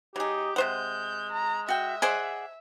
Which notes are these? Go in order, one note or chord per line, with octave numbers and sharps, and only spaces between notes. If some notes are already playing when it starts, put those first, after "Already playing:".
F#3 D#4 G4 G#4
C3 G#3 C5 F#5 G6
A#5
F#4 E5 G5
G#4 C5 D5 D#5 F#5 G#5